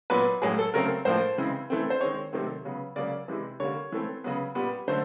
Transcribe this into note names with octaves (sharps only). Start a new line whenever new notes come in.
A#2 F#3 B3 B4
A2 F#3 A#3 G#4
A4
C#3 F#3 A3 C4 A#4
A2 F3 A#3 C5
C#3 E3 G#3 C4
E3 A3 C4
C5
D#3 G#3 C4 C#5
C3 D#3 F#3 A3 C4
C#3 F#3 B3
C#3 F#3 A#3 D5
C3 E3 G#3
D3 G3 A#3 C#5
E3 A3 C4
C#3 F#3 B3
A#2 G3 B3
D3 F#3 A3 C5